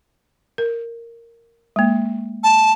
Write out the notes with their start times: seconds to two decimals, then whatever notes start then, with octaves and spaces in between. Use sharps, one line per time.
0.58 A#4
1.76 G#3 A#3
2.43 A5